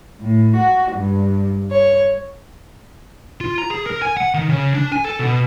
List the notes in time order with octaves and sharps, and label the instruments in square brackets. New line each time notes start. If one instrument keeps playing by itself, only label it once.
[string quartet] A2
F#4
G2
C#5
[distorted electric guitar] F4
A#5
G#4
A#4
G#5
F#5
D#3
C#3
D4
G#5
A4
B2